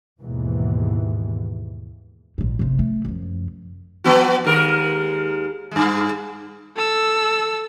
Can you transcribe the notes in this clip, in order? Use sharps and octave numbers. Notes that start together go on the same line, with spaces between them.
D#2 G#2 B2 E3
A#1 G#2
F#1 C3
A3
F#2 F3
F3 B3 F#4
D#2 G#3 A#4
G2 G#3
A4 E6